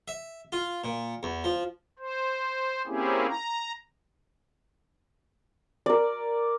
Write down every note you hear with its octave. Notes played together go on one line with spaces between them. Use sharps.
E5
F4
A#2
E2
F3
C5
A#3 C4 C#4 E4 G4 G#4
A#5
A#4 D5